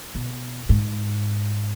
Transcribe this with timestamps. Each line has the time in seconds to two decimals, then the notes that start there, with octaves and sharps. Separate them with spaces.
0.15 B2
0.69 G#2